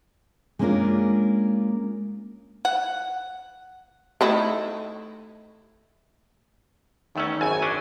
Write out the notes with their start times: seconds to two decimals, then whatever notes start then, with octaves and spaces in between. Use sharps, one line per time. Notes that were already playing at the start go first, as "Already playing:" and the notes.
0.59 G#3 A#3 C#4 D4 F4 A#4
2.65 F#5
4.21 A3 D#4 E4
7.16 E2 D#3 A3 C#4
7.41 G#1 F#2 G#5
7.62 F#3 C#4 D4